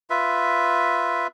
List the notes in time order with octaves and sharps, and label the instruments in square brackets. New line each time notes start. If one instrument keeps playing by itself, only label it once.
[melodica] F4 B4 E5